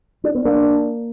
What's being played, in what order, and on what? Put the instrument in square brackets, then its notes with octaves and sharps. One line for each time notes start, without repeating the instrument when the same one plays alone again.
[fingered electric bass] D4
B3
[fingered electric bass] A#3 [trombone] D4